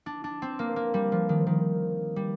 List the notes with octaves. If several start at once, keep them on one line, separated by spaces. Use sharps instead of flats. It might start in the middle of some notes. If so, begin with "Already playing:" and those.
D4
D4
C4
A#3
A#3
G3
F3
D#3
D#3
G3